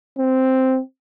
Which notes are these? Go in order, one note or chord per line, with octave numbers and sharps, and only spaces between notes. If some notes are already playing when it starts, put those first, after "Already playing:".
C4